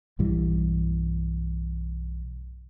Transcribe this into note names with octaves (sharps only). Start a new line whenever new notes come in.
B1 G2 E3 G3